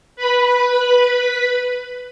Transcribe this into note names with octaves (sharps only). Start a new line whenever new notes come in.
B4 B5